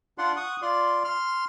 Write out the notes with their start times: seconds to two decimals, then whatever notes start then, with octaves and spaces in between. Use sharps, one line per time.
0.18 D4 F4 D5 F#5 C6
0.37 F#5 C#6 D#6
0.62 F4 D5 C6
1.04 C6 F6